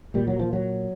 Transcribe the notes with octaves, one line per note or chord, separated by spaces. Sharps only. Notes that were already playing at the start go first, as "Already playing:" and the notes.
A#2 G3
F#3
F3
F#3